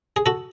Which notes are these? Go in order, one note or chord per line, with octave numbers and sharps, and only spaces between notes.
G#4
F#4 A4